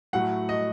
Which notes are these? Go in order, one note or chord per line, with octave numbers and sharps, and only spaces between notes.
A2 F#3 A3 F#5
D#5